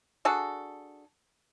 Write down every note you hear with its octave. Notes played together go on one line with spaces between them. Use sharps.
D4 F#4 G#4 A4